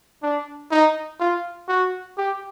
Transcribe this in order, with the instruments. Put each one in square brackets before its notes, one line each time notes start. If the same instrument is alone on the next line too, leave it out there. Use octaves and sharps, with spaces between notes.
[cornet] D4
D#4
F4
F#4
G4